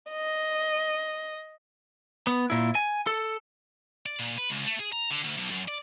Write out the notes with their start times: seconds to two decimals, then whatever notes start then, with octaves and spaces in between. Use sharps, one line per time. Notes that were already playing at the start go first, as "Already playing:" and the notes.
0.11 D#5
2.27 B3
2.50 A#2 E4
2.75 G#5
3.07 A4
4.06 D5
4.19 A#2
4.38 B4
4.50 C#2
4.65 A3
4.79 G#4
4.93 A#5
5.11 D3
5.24 D2
5.38 B1
5.51 F#2
5.68 D5